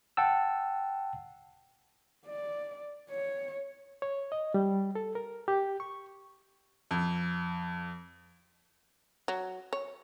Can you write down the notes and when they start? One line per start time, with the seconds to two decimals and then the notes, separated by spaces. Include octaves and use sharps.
0.17 F#5 G5 A5 E6
2.26 D5
3.10 C#5
4.02 C#5
4.32 D#5
4.54 G3
4.95 A4
5.15 A#4
5.48 G4
5.80 C#6
6.91 F2
9.28 F#3
9.73 C#5